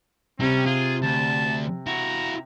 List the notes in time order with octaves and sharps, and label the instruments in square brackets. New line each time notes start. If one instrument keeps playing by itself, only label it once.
[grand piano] C3 [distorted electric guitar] G3 [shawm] C#4
[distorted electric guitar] F4 [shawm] G#4
[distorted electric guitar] D2 [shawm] A5
[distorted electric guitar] E4 F#4 [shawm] A#5